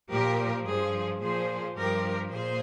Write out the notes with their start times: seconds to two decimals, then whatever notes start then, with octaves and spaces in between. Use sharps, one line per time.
0.11 A#2 F3 G4 A#4
0.66 G2 F3 G#4 C5
1.21 A#2 F3 G#4 C5
1.76 G2 F3 G4 A#4
2.31 A#2 G#4 C5